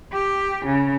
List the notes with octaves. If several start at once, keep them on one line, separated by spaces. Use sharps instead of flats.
G4
C#3